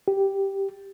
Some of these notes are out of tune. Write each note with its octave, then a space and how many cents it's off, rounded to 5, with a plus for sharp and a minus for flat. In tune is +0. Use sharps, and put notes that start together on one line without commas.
G4 +0